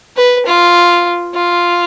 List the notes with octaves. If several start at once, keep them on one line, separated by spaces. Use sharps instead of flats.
B4
F4
F4